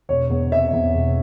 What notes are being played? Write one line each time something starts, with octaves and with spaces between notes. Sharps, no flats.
E1 C#5
E2
C3 E5
E2
E1